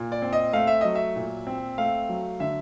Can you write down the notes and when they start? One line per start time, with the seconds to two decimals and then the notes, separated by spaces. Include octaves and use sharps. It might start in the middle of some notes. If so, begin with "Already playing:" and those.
Already playing: A#2
0.12 D5
0.22 C4
0.33 D#5
0.53 A3 F5
0.67 E5
0.81 F#3 D#5
0.95 E5
1.16 A#2
1.47 C4
1.78 A3 F5
2.09 F#3
2.40 D3 E5